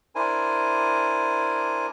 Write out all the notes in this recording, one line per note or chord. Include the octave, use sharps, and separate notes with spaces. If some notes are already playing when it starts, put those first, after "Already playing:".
D4 E4 A#4 C5 G#5